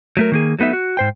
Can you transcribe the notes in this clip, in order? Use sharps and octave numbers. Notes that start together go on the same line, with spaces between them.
F#3 A3 A#4
D#3 A#3 G#4
F#3 A3 B3 D#4 E5
F#4
G#2 C5 G5